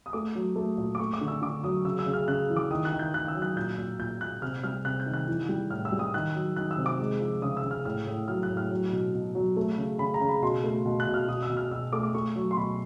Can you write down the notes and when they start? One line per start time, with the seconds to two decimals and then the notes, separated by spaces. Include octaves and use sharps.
0.06 D#6
0.13 A3 D6
0.35 F#3
0.56 A3
0.77 A#2
0.95 D6
0.99 A3 C#6
1.14 D6
1.21 D3
1.28 E6
1.42 D3 D6
1.64 F#3 D#6
1.85 C#3 E6
1.99 E6
2.06 C#3
2.13 F6
2.28 C#3 F#6
2.50 E3
2.57 D6
2.71 D#3 D#6
2.85 F#6
2.92 D#3
2.99 G6
3.14 D#3 F#6
3.28 E6
3.35 F#3
3.42 F#6
3.56 A#2 G6
3.78 A#2
3.99 A#2 G6
4.21 A#2 F#6
4.42 C3 F6
4.64 G3 F6
4.85 C3 F#6
5.00 G6
5.07 D#3
5.14 F#6
5.28 E3
5.49 G3
5.70 A2 F6
5.85 E6
5.92 G3
5.99 D#6
6.14 D#3 F#6
6.35 F#3
6.56 D#3 F#6
6.71 E6
6.78 C3
6.86 D6
7.00 G#3
7.20 F3
7.42 C#3 D#6
7.57 E6
7.64 C#3
7.71 F6
7.85 A2 F6
8.07 A2
8.28 F#3 F6
8.43 F#6
8.50 A2
8.57 F6
8.71 F#3
8.92 B2
9.14 B2
9.35 F#3
9.57 A3
9.78 C#3
9.99 C#3 B5
10.14 A#5
10.21 C#3
10.29 B5
10.42 B2 C6
10.64 A3
10.85 B2
11.00 F#6
11.07 B2
11.14 F6
11.28 B2 D#6
11.42 E6
11.50 B2
11.57 F6
11.71 B2 E6
11.93 A3 D6
12.03 D6
12.15 A3 C#6
12.36 F#3
12.51 C6
12.57 B2 B5